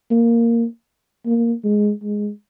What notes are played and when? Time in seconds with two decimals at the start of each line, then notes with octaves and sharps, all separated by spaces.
0.11 A#3
1.26 A#3
1.64 G#3
2.03 G#3